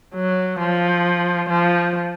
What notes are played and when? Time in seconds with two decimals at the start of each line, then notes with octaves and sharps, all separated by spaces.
0.15 F#3
0.60 F3
1.50 F3